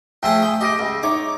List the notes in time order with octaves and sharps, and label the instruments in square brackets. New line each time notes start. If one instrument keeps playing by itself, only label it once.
[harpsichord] F3 A3 G#4 [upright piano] G5
[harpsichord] G5 [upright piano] D#6
[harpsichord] G4 [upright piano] D#5 A#6 D7
[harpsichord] C#2
[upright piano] D#4 C#5 [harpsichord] D6